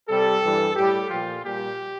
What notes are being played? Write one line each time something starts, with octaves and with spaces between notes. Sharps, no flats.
C3 G3 A4
G2 E3 G3
A2 G3 G4
A#2 F3 F4
A#2 G3 G4